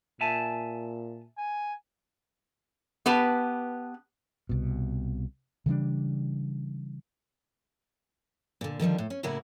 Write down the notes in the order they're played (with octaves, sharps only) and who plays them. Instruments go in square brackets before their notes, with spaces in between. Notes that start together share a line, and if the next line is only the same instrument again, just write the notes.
[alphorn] A#2 [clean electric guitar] E5 G#5 A5
[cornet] G#5
[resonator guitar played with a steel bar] B3 G4 B4 A5
[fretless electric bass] C2 B2
C#3 E3 G3 D4
[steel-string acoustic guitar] A#2 D3
D3 D#3 F3 G3
A2
C#4
A2 C#3 A#3 C#4 E4 F#4